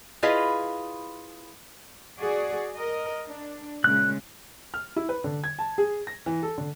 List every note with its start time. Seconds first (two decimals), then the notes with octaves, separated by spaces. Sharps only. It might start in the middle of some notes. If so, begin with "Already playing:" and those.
0.23 E4 F4 G#4 B4 D#5 F5
2.19 F#4 G#4 D5
2.76 A#4 D#5
3.27 D4
3.84 A#2 C#3 G#3 F#6
4.74 F6
4.96 E4
5.09 B4
5.24 D3
5.44 G#6
5.59 A5
5.78 G#4
6.07 A#6
6.26 E3
6.43 A4
6.58 D3